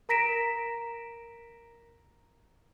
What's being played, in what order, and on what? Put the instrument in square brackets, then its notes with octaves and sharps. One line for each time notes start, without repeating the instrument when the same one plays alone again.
[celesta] A#4 A#5 A#6 B6 D7 E7